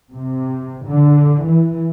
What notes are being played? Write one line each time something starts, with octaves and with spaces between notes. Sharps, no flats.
C3
D3
E3